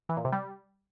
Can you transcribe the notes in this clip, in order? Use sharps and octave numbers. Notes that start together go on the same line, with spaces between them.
E3
A#2
C3
G3